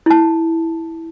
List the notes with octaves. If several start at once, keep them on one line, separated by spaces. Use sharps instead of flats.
E4 A5